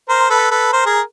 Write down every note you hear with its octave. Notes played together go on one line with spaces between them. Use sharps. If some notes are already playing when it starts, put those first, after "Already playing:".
A#4 C5
A4 B4
A4 B4
A#4 C5
G#4 A#4